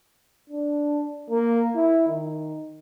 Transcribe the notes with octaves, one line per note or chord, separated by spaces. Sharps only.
D4
A#3
E4
D#3